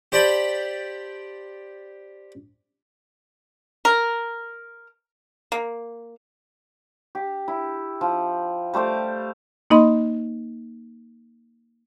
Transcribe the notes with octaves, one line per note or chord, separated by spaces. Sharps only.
G4 C5 D5 A5 B5
A#4
A#3
G4
E4
F3
G3 A3 C5 D6
A#3 D#4 D#5 B5 C6